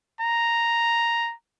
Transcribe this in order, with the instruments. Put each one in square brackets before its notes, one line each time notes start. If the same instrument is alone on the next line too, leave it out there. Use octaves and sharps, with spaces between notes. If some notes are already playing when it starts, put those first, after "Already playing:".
[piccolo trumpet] A#5